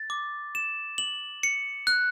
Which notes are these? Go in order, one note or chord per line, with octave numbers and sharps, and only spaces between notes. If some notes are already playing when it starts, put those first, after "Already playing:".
Already playing: A6
D6
E7
F#7
C#7
F#6